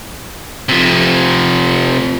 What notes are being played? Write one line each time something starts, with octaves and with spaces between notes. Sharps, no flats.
C3 F3